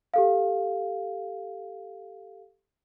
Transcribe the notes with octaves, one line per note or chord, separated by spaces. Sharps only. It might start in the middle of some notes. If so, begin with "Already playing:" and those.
G4 A4 F5